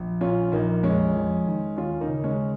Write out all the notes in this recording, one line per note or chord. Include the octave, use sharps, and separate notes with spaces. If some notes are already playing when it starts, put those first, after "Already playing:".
Already playing: A#1
A#2 C#4 F4
A#1 A#3 D#4
F1 G#3 C#4
F2
D#3
D#2 C#4 F4
A#3 D#4
C#3
G#3 C#4